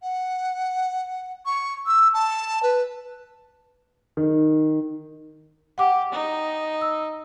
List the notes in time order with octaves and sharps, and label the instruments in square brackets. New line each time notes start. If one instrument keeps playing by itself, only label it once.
[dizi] F#5
C#6
E6
A5
B4
[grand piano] D#3
[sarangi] G4 [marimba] F#5 D6
[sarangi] D#4
[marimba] E6